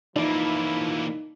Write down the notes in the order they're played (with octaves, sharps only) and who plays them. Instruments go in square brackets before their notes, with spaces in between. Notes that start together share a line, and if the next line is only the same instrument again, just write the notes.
[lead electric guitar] E3 A#3 [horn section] F3 E4 [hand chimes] D#4 [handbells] D5